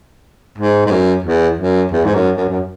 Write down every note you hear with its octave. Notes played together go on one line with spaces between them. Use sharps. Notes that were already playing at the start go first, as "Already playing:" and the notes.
G#2
G#2
F#2
E2
F#2
E2
G#2
F#2
F#2
F#2